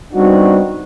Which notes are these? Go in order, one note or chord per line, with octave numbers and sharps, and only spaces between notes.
G3 B3 C4 D4 D#4 F#4